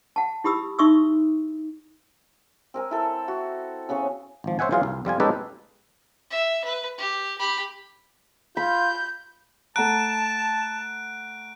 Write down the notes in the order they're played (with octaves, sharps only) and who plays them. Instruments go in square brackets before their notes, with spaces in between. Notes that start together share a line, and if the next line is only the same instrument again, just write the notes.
[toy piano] F#5 A5
E4 G4 B5 D#6 E6
D#4 E5 C6 C#6 D#6 E6
[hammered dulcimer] C4 A#4 G#5
E4 A4
F#4
C#3 B3 G#4 C#5
[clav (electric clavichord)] G#1 F3
C5 C#5 E5 F#5 G#5
E3 F#3 F4 G#4 F5
C2
F2 G3 F4 G#5
G#3 C#4 D#4 G4 A4 B4
[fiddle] E5
B4
G4
G4 B5
[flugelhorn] F4 [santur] B5 [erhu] G6
[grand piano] A3 F#5 A#5 [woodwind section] A5 [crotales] F#6 D7